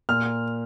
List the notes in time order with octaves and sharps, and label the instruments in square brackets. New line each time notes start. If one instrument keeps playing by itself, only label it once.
[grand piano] A#2 F6